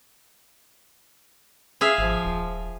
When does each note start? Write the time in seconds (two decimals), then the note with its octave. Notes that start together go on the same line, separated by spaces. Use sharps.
1.81 G#4 E5 F5
1.98 G#1 F3
2.25 D#1